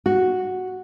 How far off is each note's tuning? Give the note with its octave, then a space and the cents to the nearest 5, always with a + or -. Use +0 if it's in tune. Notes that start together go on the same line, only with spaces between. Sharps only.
F#4 +0